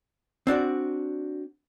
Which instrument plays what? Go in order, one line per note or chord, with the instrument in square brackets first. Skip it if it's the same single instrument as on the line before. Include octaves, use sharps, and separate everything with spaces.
[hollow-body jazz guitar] C4 D4 F#4 D5